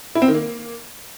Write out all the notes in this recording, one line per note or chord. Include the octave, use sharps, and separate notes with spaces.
E4
C4
D#3
A#3